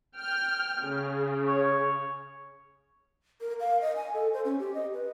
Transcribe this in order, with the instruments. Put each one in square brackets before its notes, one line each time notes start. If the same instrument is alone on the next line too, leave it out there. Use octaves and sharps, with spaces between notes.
[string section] G5 F6
C#3
[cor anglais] C#5
[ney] A#4
F5
D#5
G#5
A4
C5
C#4
G4
D#5
B4